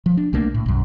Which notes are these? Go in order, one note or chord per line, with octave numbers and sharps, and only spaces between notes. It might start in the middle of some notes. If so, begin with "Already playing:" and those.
F3
D4
C2 A3 A#3 D4
A2
B1 F#2